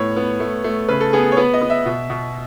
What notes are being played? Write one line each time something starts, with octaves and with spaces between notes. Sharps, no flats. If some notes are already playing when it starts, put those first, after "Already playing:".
Already playing: A2 B3 C#5
B3
A3
A3
C#3 B4
A4
B3 G#4
C#5
B3 B4
D#5
B3
E5
B2
B2